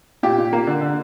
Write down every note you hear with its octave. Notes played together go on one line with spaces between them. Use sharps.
A#2 G4
A#2
A#3
D3
D3